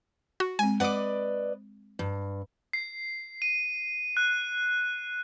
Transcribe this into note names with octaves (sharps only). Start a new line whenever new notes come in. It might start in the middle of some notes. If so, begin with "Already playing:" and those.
F#4
G#3 C4 G#5
B4 D5 D#5 F#5 D6
G2
C7
D#7
F#6